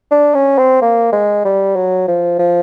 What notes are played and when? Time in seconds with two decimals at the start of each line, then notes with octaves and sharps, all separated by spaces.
0.11 D4
0.34 C#4
0.58 C4
0.82 A#3
1.12 G#3
1.45 G3
1.75 F#3
2.08 F3
2.39 F3